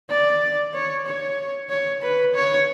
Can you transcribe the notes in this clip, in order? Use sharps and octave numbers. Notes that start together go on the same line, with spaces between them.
D5
C#5
C#5
C#5
B4
C#5